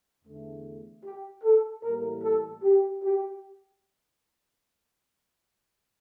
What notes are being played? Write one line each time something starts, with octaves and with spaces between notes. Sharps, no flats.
E2 D3 A3
G4
A4
A2 E3 G3 A#3 A#4
A4
G4
G4